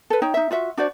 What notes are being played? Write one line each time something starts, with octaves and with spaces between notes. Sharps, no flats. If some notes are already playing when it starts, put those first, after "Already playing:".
A4 B4
D#4 C#5 G5
D#4 E5
F4 F#4 E5
D4 F#4 C5 D5